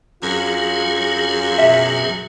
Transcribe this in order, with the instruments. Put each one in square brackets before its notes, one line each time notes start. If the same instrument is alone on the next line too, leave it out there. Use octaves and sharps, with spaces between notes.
[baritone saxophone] F#2 [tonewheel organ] F#3 G#4 [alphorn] F4
[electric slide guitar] B2 E5